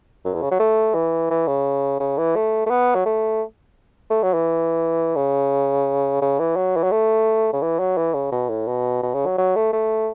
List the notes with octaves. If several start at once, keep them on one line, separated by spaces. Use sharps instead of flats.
F#2
E2
C#3
F#3
A3
E3
E3
C#3
C#3
E3
A3
A3
B3
F#3
A3
A3
F#3
E3
C#3
C#3
E3
F#3
E3
F#3
A3
C#3
E3
F#3
E3
C#3
B2
A2
B2
B2
C#3
F#3
F#3
A3
A3